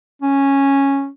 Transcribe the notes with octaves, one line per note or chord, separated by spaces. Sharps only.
C#4